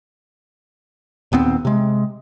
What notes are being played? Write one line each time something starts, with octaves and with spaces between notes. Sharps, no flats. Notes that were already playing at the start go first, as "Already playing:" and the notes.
D#1 D#2 B3 C4
C3 G#3